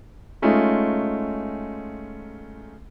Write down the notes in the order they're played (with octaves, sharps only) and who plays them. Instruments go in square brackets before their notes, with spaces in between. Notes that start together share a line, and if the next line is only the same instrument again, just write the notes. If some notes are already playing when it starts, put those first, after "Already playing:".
[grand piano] G#3 A3 C#4 D#4 F4